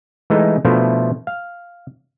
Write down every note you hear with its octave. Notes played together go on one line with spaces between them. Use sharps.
E3 G#3 A3 D#4
B2 F3 A3 D4 E4 F4
F5